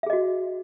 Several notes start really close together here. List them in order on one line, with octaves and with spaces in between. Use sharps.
E5 G#4 D#5 F#4